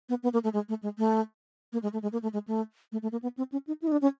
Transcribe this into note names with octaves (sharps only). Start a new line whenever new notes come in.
B3
B3
A#3
A3
G#3
A3
G#3
A3
A#3
G#3
A3
G#3
A#3
A3
G#3
A3
A3
A3
A#3
B3
C4
C#4
D#4
E4
D#4
D4
C#4